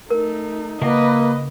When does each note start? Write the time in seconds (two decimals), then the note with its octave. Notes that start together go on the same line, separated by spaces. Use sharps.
0.10 A3 D#4 A#4
0.82 C#3 A#3 E4 A#4 B4 D#5 E5 F#5